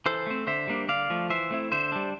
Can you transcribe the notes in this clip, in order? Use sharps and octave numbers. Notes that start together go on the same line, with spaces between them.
E3 A4 C5
A3 C4
D3 C5 E5
G3 A#3 D4
D3 D5 F5
F3 A3
E3 C5 E5
A3 C4 E4
D3 C5 E5
G3 D4